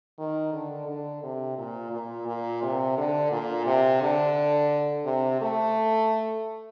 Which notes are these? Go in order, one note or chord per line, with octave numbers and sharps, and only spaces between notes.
D#3
D3
D3
C3
A#2
A#2
A#2
C3
D3
A#2
C3
D3
C3
A3